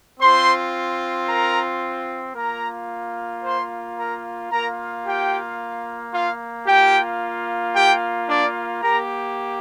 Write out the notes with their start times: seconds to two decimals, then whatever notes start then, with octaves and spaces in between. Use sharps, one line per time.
0.20 C4 F4 C5 C6
1.28 A#4 A#5
2.36 A#3 F4 A#4 A#5
3.43 C5 C6
3.98 A#4 A#5
4.51 A#3 F4 A#4 A#5
5.05 G4 G5
6.13 F4 F5
6.67 A#3 F4 G4 G5
7.75 G4 G5
8.29 D4 D5
8.82 A#3 G4 A#4 A#5